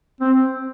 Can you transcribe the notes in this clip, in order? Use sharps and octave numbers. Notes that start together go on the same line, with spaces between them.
C4